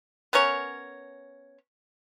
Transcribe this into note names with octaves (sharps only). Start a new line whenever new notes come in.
B3 C#4 A#4 C#5